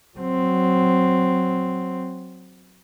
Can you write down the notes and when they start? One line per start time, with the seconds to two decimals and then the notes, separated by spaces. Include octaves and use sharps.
0.17 F#3 C4